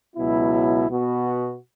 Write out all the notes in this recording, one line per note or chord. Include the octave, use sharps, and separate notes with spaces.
C#2 B2 F#3 B3 E4
B2 B3 F#4